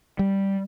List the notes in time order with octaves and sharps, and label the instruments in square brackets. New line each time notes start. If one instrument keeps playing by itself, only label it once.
[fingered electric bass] G3